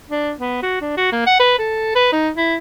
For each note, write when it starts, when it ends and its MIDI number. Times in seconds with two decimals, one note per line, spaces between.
0.10 0.32 62
0.40 0.59 59
0.63 0.81 66
0.81 0.95 62
0.97 1.09 66
1.12 1.24 58
1.26 1.37 78
1.40 1.55 71
1.59 1.91 69
1.95 2.08 71
2.12 2.29 63
2.37 2.57 64